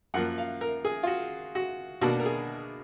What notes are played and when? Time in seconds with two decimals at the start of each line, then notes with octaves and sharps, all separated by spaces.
0.14 F#2 F3 A#3 F#5
0.38 F5
0.61 A#4
0.85 G#4
1.03 F4
1.07 F#4
1.55 F#4
2.01 B2 A#3 D4 F#4
2.19 A#4
2.26 G#4